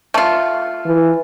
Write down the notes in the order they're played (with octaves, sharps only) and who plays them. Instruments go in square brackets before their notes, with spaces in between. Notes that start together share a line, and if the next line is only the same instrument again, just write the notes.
[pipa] A3 F4
[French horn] E3